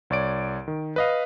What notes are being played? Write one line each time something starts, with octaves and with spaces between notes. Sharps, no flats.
C2 C#5 D5 D7
D#3
B4 D#5 F5